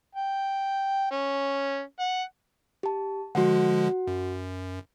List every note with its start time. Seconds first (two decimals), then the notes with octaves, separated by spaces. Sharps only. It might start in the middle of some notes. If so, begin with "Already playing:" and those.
0.15 G5
1.12 C#4
1.99 F#5
2.83 G4 A5
3.35 D3 F3 G#3 F#4 F#5
4.07 F#2